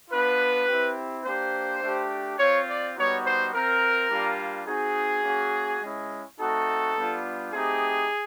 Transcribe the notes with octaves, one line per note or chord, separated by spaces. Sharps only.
B3 D4 F4 B4
C4 E4 G4
A#3 D4 G4 C5
A3 D4 G4
C4 F4 C#5
D5
G3 B3 D#4 F#4 C#5
C5
C4 F4 A#4
G3 A#3 D4 F4
C4 D#4 F#4 G#4
A#3 C#4 F#4
G#3 C#4 E4
A3 C4 D#4 F#4 A4
G3 B3 D4 F4
A3 C4 D#4 G4 G#4